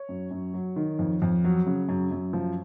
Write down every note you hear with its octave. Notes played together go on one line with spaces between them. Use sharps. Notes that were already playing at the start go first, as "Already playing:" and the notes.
Already playing: C#5
F#2
F#2
F#3
D#3
F2
F2
F#3
C#3
F#2
F#2
F3